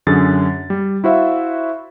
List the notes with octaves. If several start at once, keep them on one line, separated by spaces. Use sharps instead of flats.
F#2 D3 G#4 A6
G3
E4 F#4 C5 E5 F5